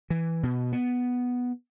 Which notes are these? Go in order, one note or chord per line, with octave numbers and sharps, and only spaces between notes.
E3
B2
B3